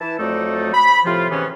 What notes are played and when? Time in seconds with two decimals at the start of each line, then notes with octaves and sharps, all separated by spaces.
0.01 E3 E4 A5
0.19 F2 F#3 A3 D#4 A4 D5
0.74 B5
1.05 A2 C3 F3 F4
1.30 G#2 C3 E3 B3 C#4